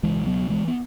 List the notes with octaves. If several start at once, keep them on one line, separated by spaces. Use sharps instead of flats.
C#2 B2 E3 G#3
F#3 B3
E3 G#3
B3